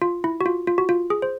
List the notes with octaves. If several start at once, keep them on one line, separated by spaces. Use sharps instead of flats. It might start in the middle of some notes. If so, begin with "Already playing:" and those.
F4
E4
F#4
F4
F4
F#4
F4
G#4
C5